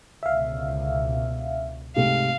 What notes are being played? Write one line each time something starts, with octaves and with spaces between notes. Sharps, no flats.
C#2 B2 D3 E5 F5
G#2 C3 A3 F5